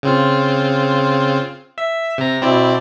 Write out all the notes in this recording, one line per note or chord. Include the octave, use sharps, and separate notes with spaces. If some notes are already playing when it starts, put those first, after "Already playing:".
C#3 C4 F4
E5
C3 A#5
B2 C4 E4 D5